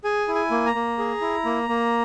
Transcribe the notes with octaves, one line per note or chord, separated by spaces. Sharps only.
G#4 G#5
E4
G#5
A#3
A#5
A#3
G#4
E4
A#3
A#3